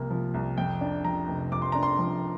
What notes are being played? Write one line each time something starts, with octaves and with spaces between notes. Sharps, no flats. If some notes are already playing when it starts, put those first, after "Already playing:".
Already playing: C2 C3 F3 A#3
F3
C2
F2 G5
D4
F3 A#5
F1
F2 D6
C6
D4 A#5
C6
F3